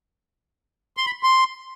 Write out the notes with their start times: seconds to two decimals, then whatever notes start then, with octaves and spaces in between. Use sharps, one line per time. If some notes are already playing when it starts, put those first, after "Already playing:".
0.97 C6
1.06 B5
1.23 C6